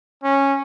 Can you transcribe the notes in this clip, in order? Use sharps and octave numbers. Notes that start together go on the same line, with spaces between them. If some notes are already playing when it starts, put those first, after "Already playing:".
C#4